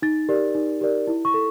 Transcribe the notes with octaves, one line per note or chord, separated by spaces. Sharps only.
D#4 A6
G4 A#4 D5
D#4
G4 A#4 D5
E4
C#6
A4